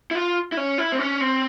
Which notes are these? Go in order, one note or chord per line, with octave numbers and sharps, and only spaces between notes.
E4
F4
E4
C#4
E4
C4
C#4
C4